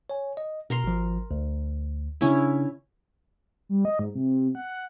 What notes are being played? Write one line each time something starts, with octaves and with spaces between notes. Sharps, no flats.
C#5 G#5
D#5
B2 A#4 A#5 C6
G#1 F3
D2
C#3 C#4 D4 E4
G3
D#5
G#2
C3
F#5